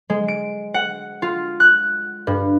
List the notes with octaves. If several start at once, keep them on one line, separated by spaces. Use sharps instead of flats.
G#3
D7
F#5
F4
F#6
G2